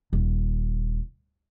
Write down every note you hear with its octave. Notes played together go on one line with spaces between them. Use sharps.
D#1